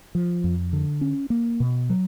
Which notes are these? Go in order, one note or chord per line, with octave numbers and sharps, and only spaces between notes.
F3
F2
D3
C#4
A#3
B2
F#3